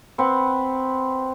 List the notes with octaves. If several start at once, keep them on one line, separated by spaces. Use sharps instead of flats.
C4 B4 F#5